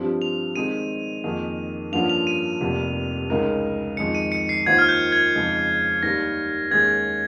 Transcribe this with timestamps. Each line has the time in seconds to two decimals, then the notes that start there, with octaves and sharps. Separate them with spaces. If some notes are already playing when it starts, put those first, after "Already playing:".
Already playing: G2 F3 C4 G4
0.22 F7
0.56 D#3 G#3 C4 D#4 G#4 D#7
1.24 F2 D#3 A#3 D#4 G#4
1.92 G2 F3 A#3 C#4 F4 F7
2.09 F7
2.27 D#7
2.60 F1 F2 C3 G3 A#3
3.30 C#2 C#3 G#3 D#4 A#4
3.97 F2 D#3 G#3 D#4 C#7
4.15 D#7
4.32 C#7
4.49 C7
4.66 D#2 D#3 A#3 F4 C5 G#6
4.78 F6
4.89 G6
5.12 G#6
5.35 F2 C#3 G#3 D#4
6.03 D#2 D#3 G3 A#6
6.71 D#2 D#3 G#3 C#4 G#4 G#6